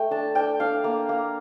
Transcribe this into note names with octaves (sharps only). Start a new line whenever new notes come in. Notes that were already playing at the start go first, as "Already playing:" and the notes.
Already playing: A3 G5
D4 A5
D4 G5
D4 F5
A#3
A#3